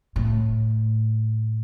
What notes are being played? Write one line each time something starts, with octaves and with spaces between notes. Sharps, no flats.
A2